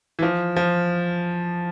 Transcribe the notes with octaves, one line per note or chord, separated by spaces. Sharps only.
E3
F3
F3